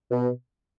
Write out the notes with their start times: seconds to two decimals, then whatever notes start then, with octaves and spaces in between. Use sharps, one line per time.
0.11 B2